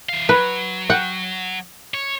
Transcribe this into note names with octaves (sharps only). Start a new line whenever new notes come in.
E3 F5
F#3 B4
F#5 G5
C#5